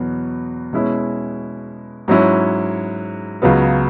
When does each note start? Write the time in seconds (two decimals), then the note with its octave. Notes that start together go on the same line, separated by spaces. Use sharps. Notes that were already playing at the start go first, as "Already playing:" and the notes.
Already playing: E2 B2 F#3 B3
0.73 B2 G#3 C#4 E4
2.08 G#2 F#3 C#4 E4
3.42 C#2 C#3 F#3 B3